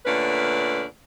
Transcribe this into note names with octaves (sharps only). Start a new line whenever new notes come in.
A#2 D3 A3 C#4 B4 D5